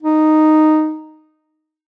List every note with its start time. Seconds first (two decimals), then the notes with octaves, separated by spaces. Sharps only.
0.02 D#4